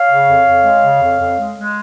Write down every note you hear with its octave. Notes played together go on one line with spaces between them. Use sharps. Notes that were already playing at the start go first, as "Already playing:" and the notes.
Already playing: C#5 F5
C#3
F2
F2
G#3
C#3
F2
F2
G#3
G#3